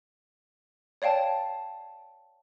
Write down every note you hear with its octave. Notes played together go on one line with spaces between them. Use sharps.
C#5 D5 F5 G5 A5